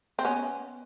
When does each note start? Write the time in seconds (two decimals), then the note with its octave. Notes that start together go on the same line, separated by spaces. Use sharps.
0.19 C4
0.25 B3 C#4